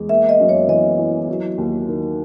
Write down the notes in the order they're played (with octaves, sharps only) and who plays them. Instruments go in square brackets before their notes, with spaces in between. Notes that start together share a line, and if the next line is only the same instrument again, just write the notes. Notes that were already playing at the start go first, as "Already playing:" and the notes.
Already playing: [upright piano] E2 G#3
[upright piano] A#3 [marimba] E5
[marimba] D#5
[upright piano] F#2
[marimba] C#5
[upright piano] E3 [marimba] D#5
[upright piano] E4
F#3
D#2
D#3